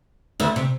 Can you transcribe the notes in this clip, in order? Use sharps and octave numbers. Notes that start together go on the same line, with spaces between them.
D2 D3
C3